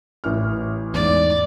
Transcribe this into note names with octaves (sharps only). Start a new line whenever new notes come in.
A1 E3 F6
E2 G#2 D5